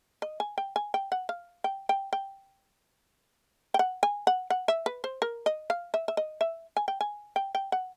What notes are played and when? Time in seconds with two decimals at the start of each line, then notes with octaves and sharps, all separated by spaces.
0.22 D#5
0.40 G#5
0.58 G5
0.76 G#5
0.94 G5
1.12 F#5
1.29 F5
1.64 G5
1.89 G5
2.13 G5
3.74 G5
3.79 F#5
4.03 G#5
4.27 F#5
4.50 F#5
4.68 E5
4.86 B4
5.04 C5
5.22 A#4
5.46 D#5
5.70 F5
5.94 E5
6.08 E5
6.17 D#5
6.41 E5
6.77 G#5
6.88 G5
7.01 G#5
7.36 G5
7.55 G5
7.72 F#5